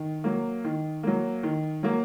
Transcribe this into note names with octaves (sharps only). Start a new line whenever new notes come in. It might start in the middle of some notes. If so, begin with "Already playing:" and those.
Already playing: D#3
F#3 A#3
D#3
F#3 A#3
D#3
F#3 A#3